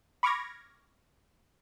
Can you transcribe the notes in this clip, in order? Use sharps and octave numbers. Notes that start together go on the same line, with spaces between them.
B5 C#6 D6 F6 G#6 A#6